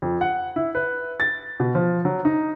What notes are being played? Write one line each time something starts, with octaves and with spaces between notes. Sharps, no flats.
F2
F#5
E4
B4
A6
B2
F3
F#3
D#4